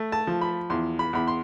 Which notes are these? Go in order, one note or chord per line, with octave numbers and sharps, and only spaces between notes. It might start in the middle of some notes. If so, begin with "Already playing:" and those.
Already playing: A3
A5
F3
B5
E2 C6
B5
E2 B5
C6